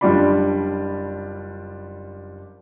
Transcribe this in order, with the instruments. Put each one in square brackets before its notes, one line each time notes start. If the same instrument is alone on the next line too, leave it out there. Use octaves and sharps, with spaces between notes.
[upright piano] F#1 G3 D4 F4 D5 B5